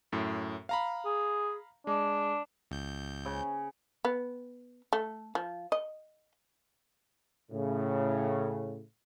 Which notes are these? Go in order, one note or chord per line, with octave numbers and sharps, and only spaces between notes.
F#2 A2
F5 A#5 B5
G#4
G#3 D4
C#2 G6
C#3
B3
A3
F3
D#5
A2 C#3